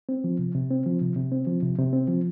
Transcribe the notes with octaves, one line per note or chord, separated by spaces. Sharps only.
C4
F3
C3
C3
C4
F3
C3
C3
C4
F3
C3
C3
C4
F3